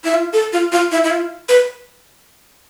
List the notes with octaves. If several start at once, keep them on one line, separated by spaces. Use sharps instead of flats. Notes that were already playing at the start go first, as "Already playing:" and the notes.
E4
F4
A4
F4
F4
E4
E4
F4
B4